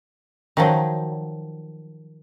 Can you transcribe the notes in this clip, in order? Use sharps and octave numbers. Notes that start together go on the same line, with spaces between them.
D#3 F3 F#3